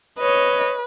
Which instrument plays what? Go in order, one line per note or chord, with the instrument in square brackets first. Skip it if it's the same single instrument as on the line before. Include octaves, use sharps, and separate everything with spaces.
[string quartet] B4 [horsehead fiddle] C#5 D#5